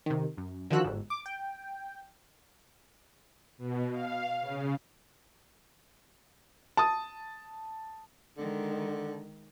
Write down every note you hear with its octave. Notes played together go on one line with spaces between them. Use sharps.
C3 D#3
F#2
D3 D#3 F3 F#4 E6 F#6
G1 G#2
D6
G5
B2
F5
C#3
A5 D#6
D3 D#3 G#3